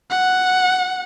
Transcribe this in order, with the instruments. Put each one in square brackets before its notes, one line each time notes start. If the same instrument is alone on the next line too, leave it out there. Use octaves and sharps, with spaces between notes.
[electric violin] F#5